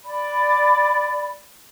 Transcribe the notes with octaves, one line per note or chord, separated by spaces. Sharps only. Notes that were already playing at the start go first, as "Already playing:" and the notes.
D5 B5